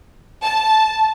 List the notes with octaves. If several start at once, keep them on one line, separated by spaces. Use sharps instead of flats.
A5